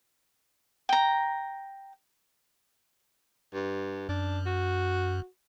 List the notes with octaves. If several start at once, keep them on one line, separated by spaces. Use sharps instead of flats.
G5 A#5
G2
F#2 D4
F#4